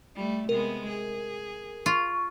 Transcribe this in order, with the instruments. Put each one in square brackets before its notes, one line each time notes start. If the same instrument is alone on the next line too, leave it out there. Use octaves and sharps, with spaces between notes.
[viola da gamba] G3 A3
[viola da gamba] C3 G#3 B3 [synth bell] A#4
[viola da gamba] G#4
[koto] F4 [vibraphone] C#6